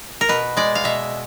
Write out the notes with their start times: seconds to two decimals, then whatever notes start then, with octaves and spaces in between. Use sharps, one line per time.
0.21 A#4
0.29 B2 B4
0.57 G#3 D5
0.75 F5
0.84 B2 E5